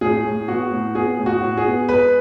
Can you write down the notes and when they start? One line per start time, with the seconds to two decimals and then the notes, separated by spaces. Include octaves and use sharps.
0.01 A2 G#4
0.25 A2
0.48 B3 F#4
0.71 A2
0.95 B3 G#4
1.19 A2
1.26 F#4
1.42 A2
1.57 G#4
1.66 B3
1.89 G#3 B4